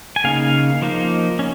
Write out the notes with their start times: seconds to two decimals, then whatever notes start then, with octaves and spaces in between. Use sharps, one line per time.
0.16 G#5
0.24 C#3 A#3 D#4 F5
0.82 F3 A#3 D#4
1.39 C#4